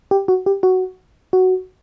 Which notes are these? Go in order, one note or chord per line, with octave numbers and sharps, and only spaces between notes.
G4
F#4
G4
F#4
F#4